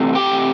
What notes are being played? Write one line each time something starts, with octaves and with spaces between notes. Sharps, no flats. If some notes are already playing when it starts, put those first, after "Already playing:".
Already playing: C3 E3 A3
G4 G5